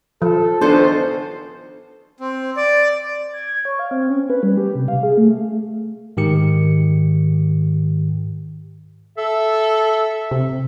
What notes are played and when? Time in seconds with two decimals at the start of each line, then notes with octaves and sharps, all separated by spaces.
0.22 F3 A4
0.61 G#1 C#2 B3 D4 D#4 A4 C5
2.20 C4
2.56 D5
3.33 G#6
3.65 C#5
3.79 F5
3.91 C4
4.10 C#4
4.30 B4
4.43 G3
4.57 G4
4.75 C3
4.88 F5
5.03 G#4
5.18 A3
6.17 G#2 D#3 G4 C#7
9.18 A4 E5
10.31 C3